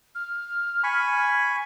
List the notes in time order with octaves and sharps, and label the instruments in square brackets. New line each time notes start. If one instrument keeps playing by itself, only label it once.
[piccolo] F6
[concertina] G#5 B5 C#6